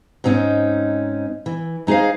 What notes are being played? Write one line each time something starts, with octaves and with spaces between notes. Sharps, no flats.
G#2 C4 C#4 D#4
E3
G#3 D#4 G#4 C5 F5